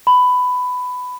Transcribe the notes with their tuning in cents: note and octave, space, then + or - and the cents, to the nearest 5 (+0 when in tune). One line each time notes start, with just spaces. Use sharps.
B5 +15